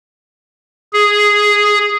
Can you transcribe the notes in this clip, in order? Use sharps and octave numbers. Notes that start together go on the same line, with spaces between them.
G#4